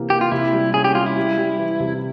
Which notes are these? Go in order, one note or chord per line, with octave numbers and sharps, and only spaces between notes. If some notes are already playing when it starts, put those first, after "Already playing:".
Already playing: C3 E3 A#3
A#3 G4
F4
C3 E4
G3
C#4 G#4
G4
G3 F4
E4
G3
G3
E3
C3